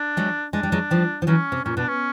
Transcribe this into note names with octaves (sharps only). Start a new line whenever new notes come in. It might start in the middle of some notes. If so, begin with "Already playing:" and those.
Already playing: D4
F#3 G#3
G#3 D4
G3
F#3 G#3
F3 G3
F3
E3 F#3 C#4
C3
A#2 C#4
B2 D4
C#4